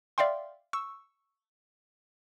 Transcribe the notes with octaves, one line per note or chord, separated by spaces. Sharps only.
D5 E5 F5 G5 C6
C#6 E6